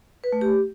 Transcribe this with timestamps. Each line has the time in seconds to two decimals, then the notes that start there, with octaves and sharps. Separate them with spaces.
0.24 B4
0.33 A3
0.41 G4